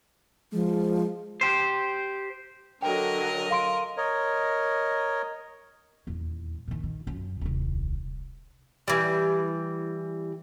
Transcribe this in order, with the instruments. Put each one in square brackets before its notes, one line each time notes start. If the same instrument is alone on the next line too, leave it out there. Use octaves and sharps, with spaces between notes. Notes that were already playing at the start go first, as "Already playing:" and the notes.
[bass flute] F3 [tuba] G#3
[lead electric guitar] G4 C5
[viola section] D3 F#3 A4 [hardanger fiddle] A#4 D#5 [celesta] G5
[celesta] F5 C6 D7
[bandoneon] A#4 C#5 D#5
[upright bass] D#1 E2
A#2 D#3
D#3
F#2 F4
D#1 C2
[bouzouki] E3 G3